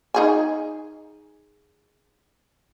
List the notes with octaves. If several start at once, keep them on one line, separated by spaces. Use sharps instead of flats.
D#4 G#4 G#5